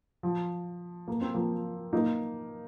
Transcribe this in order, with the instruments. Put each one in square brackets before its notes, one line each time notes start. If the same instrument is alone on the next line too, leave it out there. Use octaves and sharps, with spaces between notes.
[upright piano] F3
A#3
C4
F3 A#3
A#3 D#4